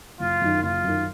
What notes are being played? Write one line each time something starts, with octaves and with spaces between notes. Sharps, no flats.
F#1 F4
F#2 D#3
F#1 F4
F#2 D#3